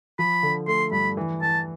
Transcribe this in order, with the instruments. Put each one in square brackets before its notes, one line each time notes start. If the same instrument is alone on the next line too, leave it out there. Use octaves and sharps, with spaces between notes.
[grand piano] F3 [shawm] B5
[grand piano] D3
[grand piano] A3 [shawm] C6
[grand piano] G2 [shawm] B5
[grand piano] E3
[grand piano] E3 [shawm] A5